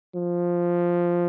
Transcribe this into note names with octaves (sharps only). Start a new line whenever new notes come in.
F3